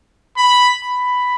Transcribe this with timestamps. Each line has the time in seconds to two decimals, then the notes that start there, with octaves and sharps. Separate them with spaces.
0.37 B5
0.84 B5